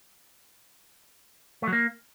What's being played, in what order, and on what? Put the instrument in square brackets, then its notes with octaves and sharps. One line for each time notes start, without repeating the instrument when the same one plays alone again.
[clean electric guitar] A3
F#3
A#3